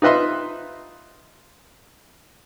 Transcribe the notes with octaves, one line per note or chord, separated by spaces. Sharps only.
D#4 F4 B4 D#5 E5 C6